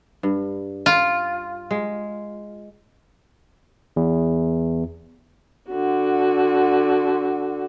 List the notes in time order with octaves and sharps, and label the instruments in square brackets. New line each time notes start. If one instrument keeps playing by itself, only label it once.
[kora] G2
[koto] F4
[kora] G#3
[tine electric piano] E2
[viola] D3 F#4